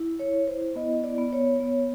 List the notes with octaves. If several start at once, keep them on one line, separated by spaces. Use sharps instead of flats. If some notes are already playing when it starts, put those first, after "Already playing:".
Already playing: E4
C#5
E4
C5
B3 D#5
D5
B3
C#5
B3